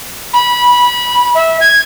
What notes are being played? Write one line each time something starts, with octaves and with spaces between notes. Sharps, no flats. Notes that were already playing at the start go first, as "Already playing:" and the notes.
B5
E5
G#6